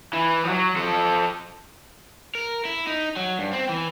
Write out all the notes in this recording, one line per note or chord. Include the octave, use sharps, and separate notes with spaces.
E3
F3 F#3
F3 A4
A#4
E4
D#4
F#3
G2
C4
E3